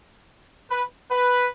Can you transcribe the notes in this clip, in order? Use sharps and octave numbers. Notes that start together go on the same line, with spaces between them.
B4
B4